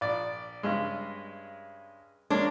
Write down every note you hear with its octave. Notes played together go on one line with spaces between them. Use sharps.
A#1 D5
G2 C#3 G#3
G#3 A#3 C#4 D4